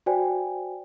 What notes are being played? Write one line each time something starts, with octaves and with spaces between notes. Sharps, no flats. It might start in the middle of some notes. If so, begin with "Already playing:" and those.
F#4 C5 D5 G5 G#5